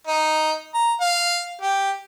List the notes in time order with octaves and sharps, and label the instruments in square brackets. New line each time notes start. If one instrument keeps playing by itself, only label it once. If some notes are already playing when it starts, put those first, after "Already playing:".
[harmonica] D#4
A#5
F5
G4